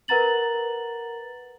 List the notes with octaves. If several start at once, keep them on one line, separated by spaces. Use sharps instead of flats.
A#4 B4 F#5 A#5 A6 F#7